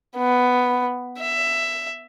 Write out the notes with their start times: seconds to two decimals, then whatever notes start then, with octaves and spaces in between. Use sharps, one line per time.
0.16 B3
1.20 E5